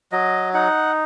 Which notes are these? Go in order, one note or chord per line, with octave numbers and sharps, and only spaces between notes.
F#3 D#5
D#4 F#5